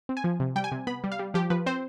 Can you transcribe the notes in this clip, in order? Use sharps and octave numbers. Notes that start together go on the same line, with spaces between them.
C4
G#5
F3
C3
G3 G5
G#5
C3
B3 B5
G3
F5
G3
F3 G4
F3 B4
C4 C5